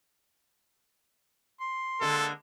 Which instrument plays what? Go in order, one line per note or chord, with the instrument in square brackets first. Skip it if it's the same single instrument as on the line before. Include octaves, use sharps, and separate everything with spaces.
[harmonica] C6
[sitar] D3 G#3 A#3 [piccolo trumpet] A4